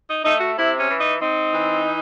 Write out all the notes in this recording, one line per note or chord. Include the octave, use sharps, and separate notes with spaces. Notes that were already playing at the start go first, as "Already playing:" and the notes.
D#4
A3 D#4
F#4
C3 E4
C#4
E3
D#4
C4 D#4
E3